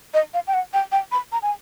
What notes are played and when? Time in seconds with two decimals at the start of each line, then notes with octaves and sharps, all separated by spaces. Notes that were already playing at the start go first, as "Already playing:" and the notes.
0.14 D#5
0.34 F5
0.47 G5
0.54 F#5
0.73 G5
0.92 G5
1.12 B5
1.32 A#5
1.42 G#5